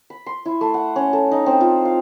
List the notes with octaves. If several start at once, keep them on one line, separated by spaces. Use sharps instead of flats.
B5
C6
E4
A3
F#5
C#4
A4
D#4
C4
F4
F5